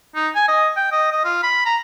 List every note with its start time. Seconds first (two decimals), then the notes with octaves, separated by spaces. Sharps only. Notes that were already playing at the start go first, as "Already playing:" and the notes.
0.15 D#4
0.35 G#5
0.48 D#5
0.76 G5
0.92 D#5
1.12 D#5
1.24 F4
1.43 B5
1.65 A#5